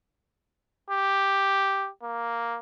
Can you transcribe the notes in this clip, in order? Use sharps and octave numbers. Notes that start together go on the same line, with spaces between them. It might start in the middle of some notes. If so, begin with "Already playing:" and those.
G4
A#3